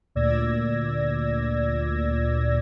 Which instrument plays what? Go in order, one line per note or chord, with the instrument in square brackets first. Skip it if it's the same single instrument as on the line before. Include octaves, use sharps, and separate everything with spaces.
[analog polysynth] D2 A#2 D5 E6 G#6 A#6